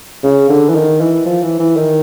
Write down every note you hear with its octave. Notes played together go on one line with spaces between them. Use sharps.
C#3
D3
E3
D#3
E3
F3
E3
E3
D#3